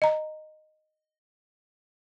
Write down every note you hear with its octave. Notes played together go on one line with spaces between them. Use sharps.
D#5 A#5